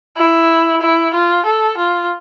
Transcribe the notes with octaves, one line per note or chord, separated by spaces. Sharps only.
E4
E4
F4
A4
F4